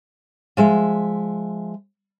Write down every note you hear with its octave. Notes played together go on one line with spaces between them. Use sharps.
F3 G#3 E5